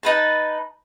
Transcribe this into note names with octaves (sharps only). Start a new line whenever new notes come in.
D#4 B4 A5